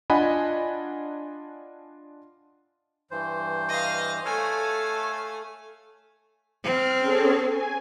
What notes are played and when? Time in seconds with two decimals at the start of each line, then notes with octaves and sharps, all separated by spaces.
0.10 D4 F4 D#5 F#5 G#5 B5
3.11 G2 E3 C5
3.69 D#5 F5
4.25 A3 A4 C#5 F5 G#5
6.64 C4 F6
6.98 C#4 G#4 A4
7.47 G#5